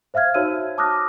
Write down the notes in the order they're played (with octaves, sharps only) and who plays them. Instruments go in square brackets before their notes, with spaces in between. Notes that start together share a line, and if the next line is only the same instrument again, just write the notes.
[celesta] C5 E5 F5 F6 G#6
D#4 F#4 C5 C#5 E6 D#7
A5 D6 D#6 F6 F#6 A#6